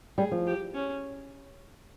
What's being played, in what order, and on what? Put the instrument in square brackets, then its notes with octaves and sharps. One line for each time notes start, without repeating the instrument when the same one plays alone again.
[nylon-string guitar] G3 [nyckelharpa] G#4
[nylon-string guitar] F3
[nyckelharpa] G4
C#4